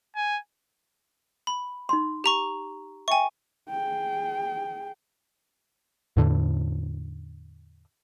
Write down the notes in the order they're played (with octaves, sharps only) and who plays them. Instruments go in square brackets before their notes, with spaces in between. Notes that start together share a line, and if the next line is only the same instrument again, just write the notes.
[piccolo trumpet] G#5
[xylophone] B5
[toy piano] D#4 C6
[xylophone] G4 A#5 C#6
[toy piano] E5 G5 [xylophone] G#5 C#6
[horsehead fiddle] G#4 G5
[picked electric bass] E2 A2 D3